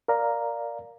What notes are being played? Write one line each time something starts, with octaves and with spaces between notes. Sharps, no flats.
A#4 D5 F5 A#5